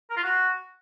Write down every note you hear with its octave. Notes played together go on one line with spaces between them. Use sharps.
A#4
F4
F#4